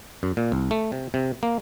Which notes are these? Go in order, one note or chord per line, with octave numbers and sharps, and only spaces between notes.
F#2
A#2
C2
A3
C3
C3
A#3